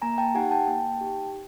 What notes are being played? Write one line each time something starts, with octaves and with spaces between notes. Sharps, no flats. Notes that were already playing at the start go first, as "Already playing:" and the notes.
A#3 G#5 A#5
G5 A5
D#4 G4 F#5 G#5
G5 A5
A#3 G5 A5
D#4 G4